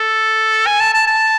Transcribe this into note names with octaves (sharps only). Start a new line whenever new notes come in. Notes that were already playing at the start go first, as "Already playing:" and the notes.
Already playing: A4
G#5
A5
A5
A5